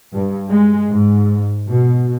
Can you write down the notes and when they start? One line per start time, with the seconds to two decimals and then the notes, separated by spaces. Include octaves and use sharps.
0.14 G2
0.48 G#3
0.90 G#2
1.67 B2